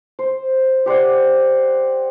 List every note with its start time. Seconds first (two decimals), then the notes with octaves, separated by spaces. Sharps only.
0.19 C5
0.86 G4 C5 D5 F#5